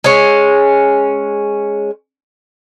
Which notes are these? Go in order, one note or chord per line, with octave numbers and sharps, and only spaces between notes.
G#3 C#4